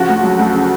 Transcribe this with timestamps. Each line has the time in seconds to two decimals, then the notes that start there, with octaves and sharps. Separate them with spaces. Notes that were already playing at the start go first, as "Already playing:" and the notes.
Already playing: C#3 F3 F#4
0.09 D2
0.24 F#3
0.39 D2
0.54 C#3